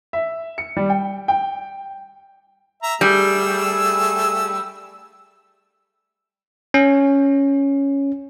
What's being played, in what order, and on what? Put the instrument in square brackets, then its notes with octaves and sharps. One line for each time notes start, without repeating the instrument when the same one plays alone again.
[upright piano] E5
C#7
G3
G5
G5
[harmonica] E5 A#5
[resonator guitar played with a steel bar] G3 [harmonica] A3 G#4 E6
[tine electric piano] C#4